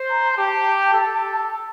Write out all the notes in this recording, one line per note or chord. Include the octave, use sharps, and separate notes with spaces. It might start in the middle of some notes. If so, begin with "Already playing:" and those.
Already playing: C5
A#5
A#5
G4 A5
A4